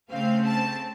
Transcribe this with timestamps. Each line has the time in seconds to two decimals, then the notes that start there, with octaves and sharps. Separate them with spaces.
0.11 C#3 A3 C4 F5
0.45 A5